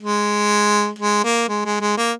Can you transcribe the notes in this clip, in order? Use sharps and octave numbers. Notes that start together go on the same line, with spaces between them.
G#3
G#3
A#3
G#3
G#3
G#3
A#3